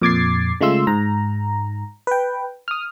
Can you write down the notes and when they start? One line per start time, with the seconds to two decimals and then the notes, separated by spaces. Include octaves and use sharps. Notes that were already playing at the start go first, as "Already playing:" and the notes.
0.02 F2 A#2 D6 G#6 A6 C7
0.61 C#3 G#3 A3 F4 C6 E6
0.87 G#2 A#5
2.07 B4 G5
2.68 D#6 F6